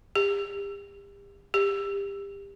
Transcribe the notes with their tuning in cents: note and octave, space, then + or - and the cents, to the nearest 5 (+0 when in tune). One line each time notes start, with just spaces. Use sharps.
G4 +35
G4 +25